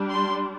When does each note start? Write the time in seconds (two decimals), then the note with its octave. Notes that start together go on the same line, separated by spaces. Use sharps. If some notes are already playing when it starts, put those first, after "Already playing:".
Already playing: G3 D4
0.11 C6